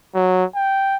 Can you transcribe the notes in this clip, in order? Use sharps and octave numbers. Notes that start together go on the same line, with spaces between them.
F#3
G5